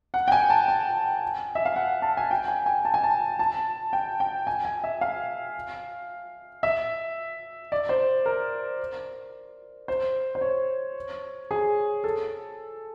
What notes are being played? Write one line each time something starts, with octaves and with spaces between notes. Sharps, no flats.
F#5
G5
G#5
A5
G#5
E5
F5
F#5
A5
G#5
G5
G#5
G#5
A5
G#5
A5
A5
G5
G5
G#5
G#5
E5
F5
E5
D5
C5
A#4
C5
C5
C#5
G#4
A4